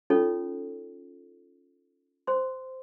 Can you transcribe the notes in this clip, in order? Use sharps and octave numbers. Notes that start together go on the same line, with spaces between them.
C#4 D#4 F4 A4 C#5
C5 C6